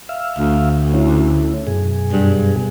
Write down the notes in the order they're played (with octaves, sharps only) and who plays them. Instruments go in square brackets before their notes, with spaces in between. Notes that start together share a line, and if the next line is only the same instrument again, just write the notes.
[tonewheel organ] E5 F5
[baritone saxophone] D2
[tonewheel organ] C#4 E4
F#2 B2 G#4
[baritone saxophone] G2